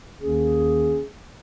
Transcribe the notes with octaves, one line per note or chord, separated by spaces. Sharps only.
D#2 D#3 A#3 C#4 G#4